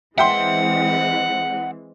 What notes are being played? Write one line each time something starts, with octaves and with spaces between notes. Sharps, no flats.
E3 G#3 C4 E5 F#5 G5 C6